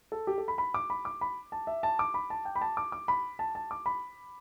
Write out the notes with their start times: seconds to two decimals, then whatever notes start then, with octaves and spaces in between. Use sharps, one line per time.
0.12 A4
0.27 G4
0.38 A4
0.48 B5
0.58 B5
0.74 D6
0.90 B5
1.05 D6
1.21 B5
1.52 A5
1.67 E5
1.83 A5
1.99 D6
2.14 B5
2.30 A5
2.45 G5
2.56 B5
2.61 A5
2.77 D6
2.92 D6
3.08 B5
3.39 A5
3.55 A5
3.71 D6
3.86 B5